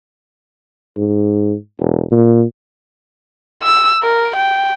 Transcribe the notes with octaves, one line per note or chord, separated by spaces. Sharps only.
G#2
E1
A#2
E6
A#4
G5